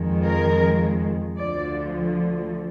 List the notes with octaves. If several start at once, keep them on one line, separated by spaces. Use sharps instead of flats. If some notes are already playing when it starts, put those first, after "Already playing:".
Already playing: F2 D#3 G#3
A#4
D2 D3 F3 D5